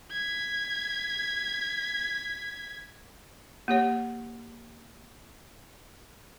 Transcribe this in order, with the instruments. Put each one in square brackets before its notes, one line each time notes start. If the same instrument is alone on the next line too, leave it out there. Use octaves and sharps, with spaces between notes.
[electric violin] G#6 B6
[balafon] A#3 G4 C#5